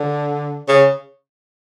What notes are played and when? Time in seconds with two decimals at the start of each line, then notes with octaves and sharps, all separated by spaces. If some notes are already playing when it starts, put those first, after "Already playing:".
Already playing: D3
0.68 C#3